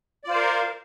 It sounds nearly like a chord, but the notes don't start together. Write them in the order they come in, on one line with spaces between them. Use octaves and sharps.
D5 F4 C5 F5 A#4